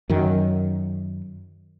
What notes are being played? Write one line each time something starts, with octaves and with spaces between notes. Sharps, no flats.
F#2 D#3